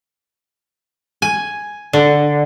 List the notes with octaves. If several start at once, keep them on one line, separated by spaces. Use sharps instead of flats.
G#5
D3